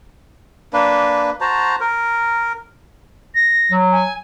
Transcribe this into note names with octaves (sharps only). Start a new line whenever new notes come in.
A#3 D4 B4
F#4 C5 A5 A#5
A#4
A#6
F#3
G#5